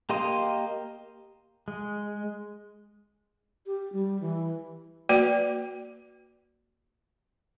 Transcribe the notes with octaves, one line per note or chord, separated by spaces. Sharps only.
A#3 G4 D#5 C6 D#6
G#3
G4
G3
E3
A#3 F#4 B4 D5 G5